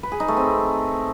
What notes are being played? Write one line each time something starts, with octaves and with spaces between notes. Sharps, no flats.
B4
G#4
D#4
A3
C4